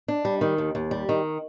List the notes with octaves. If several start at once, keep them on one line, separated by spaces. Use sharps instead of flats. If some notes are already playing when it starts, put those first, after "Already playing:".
D4
G3
D#3
D#2
D#2
G3
D#3